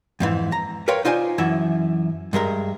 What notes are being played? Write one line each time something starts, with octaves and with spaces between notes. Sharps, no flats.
F2 G#2 E3
A#5
A#4 B4 C#5 F5 G5 C6
D#4 F4 C5 D5 G#5
F#2 E3 E4 E5
G2 G#3 A#4 E5